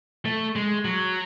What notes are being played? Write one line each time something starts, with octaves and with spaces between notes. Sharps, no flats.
A3
G#3
F#3